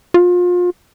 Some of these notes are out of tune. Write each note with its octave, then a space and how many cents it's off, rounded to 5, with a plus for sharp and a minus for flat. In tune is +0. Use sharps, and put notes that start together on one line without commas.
F4 +30